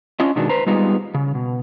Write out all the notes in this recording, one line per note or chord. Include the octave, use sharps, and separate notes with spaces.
C#4 D4 F4 D#5
B2 D#3 G#3 D4 F#4
B4 C5 A#5
G3 G#3 B3 D#4 F4
C#3
B2